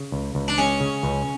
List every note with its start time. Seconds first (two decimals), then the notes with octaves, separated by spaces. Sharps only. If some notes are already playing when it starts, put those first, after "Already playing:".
Already playing: C#3
0.12 C#2
0.35 C#2
0.48 D4
0.58 G#3 C#4
0.80 C#3
1.03 C#2